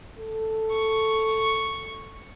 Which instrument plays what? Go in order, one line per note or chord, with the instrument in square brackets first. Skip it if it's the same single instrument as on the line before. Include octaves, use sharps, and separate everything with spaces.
[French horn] A4
[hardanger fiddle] C#6